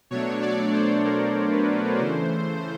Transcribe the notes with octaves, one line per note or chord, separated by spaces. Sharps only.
B2 F#3 A3 D4 C#5
D5
C5
A#4
B4
C#3 E3 A3 C5